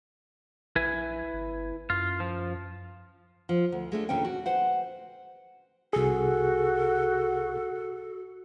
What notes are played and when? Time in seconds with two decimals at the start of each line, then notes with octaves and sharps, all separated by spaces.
0.76 A#1 E4 B4 G#5
1.33 G1
1.90 F#2 F4
2.20 F3
3.49 F3
3.72 D2
3.92 G#3 A3 D4
4.09 D#2 A#2 D3 C#4 C#5 G5
4.25 F#4
4.46 B4 C5 F#5
5.93 C2 F#4 G#4 A4